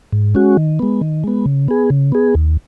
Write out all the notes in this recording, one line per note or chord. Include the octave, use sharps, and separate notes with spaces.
G#2
G#3 C#4 F#4
D#3
G#3 B3
D#3
G#3 B3
C#3
B3 G#4
C#3
B3 G#4
D#2